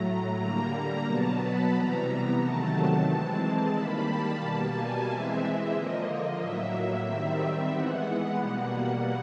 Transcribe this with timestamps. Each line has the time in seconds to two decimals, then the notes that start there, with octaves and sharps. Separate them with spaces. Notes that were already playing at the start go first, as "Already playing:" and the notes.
Already playing: A2 F#3 A3 A#5
0.40 D3 G3 A#3 A#5
1.06 B2 F#3 B3 A5
1.40 B5
1.72 C3 E3 G3 B3 A#5
2.39 C3 D#3 F#3 A3 A5
3.06 E3 G#3 C4
3.72 D#3 G3 A#3 B5
4.05 A5
4.38 B2 G3 A#3 A5
4.73 G#5
5.05 E3 G#3 C4 E5
5.71 D3 F3 A#3 D#5
6.38 A2 F#3 A#3 E5
7.05 D#3 G3 C4 E5
7.71 E3 G#3 B3 F#5
8.38 B2 G3 A#3